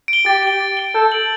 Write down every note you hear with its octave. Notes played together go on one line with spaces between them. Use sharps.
D7 G7
G4 A6
D7 G7
A6
D7 G7
A4 G6
D7 F#7